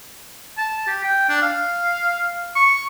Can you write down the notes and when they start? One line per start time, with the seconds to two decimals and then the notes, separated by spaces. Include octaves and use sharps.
0.57 A5
0.87 G4
1.04 G5
1.29 D4
1.42 F5
2.55 C#6